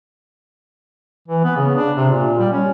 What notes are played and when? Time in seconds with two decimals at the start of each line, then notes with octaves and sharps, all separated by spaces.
1.28 E3
1.44 B3
1.56 C#3
1.75 D4
1.97 C3
2.11 A#2
2.39 G3
2.52 C#4